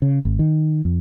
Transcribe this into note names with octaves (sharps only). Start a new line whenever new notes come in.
C#3
G#1
D#3
F2